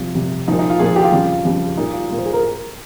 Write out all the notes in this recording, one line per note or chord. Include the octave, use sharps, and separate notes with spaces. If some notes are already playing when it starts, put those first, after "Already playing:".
Already playing: F2 C3 G3 F4
F2 C3 G3
A#2 F3 D#4
D#4
F4
A#2 F3 G#4
G4
F4
F2 C#3 G3
F2 C#3 G3
A#2 G3 D#4
F4
A#2 G3
C5
G#4
A#4